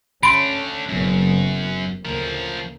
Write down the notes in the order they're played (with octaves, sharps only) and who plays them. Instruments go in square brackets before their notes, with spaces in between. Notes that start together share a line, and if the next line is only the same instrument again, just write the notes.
[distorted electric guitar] D3 A3 [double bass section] C#4 [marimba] B5 C6 [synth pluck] D7
[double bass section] F#1 C#3 B3 [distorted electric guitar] F#2
[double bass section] D2 C#3 A#3 [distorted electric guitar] F3 A#4